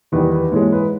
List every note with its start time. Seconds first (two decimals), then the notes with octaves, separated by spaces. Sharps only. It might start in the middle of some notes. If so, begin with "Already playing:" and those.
0.12 E2 D#3 G3 B4
0.32 B4
0.52 G#2 E3 G#3 C#5
0.72 B4